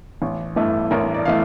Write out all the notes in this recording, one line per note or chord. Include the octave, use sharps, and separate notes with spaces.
A1
G2 E3 A3
A1 A#4
D5
E3 A3 F5